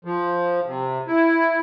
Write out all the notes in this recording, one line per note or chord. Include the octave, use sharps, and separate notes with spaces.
F3
C3
E4